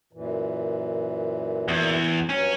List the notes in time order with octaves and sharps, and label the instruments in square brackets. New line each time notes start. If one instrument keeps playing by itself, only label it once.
[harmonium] F#2 A#2 E3
[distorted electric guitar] E2
[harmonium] G2 F#3 [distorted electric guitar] C#4